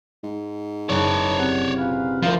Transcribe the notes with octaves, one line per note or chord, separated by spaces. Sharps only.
G#2
F#1 D#4 B4 C#5 D5 A5
C3 F#5
A#2 B4 F5
D2 D3 F3 A#4 F5